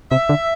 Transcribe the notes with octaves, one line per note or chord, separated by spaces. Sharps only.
C3 E5
D3